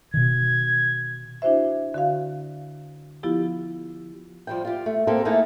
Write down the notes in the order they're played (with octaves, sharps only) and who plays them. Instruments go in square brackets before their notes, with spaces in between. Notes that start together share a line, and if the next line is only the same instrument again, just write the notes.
[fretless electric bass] B2 D#3 [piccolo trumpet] G#6
[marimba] D4 E4 F#4 C5 E5
D3 F#4 F5
F3 B3 E4 F4 G4
[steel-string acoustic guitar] F3 G3 G5
F4 G4
A3
A#3 C4 G4 A4
A3 A#3 D#4 E4 G#4 A4